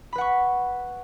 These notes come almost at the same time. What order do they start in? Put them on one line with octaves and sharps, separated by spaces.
B5 B4 F#5 C#6